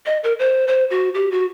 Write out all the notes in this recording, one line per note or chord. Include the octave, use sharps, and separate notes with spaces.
D#5
A#4
C5
C5
F#4
G4
F#4